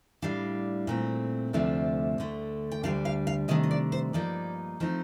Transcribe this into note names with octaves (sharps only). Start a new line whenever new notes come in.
A2 G3 D4 F5
A#2 A3 C4
D2 C3 F3 A3 D4
D2 D3 A3
G5
D2 D3 G3 D4 F5
F5
F5
C3 D#3 A3 D4 D#5
D#5
D5
C5
G2 F3 A#3 D#4 D5
F3 A3 C4 D#4